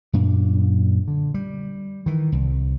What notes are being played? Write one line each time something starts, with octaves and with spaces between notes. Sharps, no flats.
F#2 A#2 D4
D3
G3
D#3 E3
C2